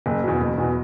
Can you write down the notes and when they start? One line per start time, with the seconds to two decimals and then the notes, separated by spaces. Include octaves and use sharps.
0.06 F#1
0.23 E2 B2
0.40 F#1
0.58 E2 B2